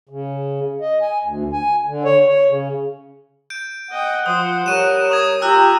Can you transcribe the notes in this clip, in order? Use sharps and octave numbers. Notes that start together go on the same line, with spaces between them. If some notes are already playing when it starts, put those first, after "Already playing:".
C#3
D#5
G#5
D2
G#5
D3
C#5
C#5
C#3
G6 D7
D#5 F#5 G5
F3 C5 D#6
G3 A#4 C#5 C#6 D#7 E7
C#6 D#6 G#6
F4 G4 A#5 E6 F#6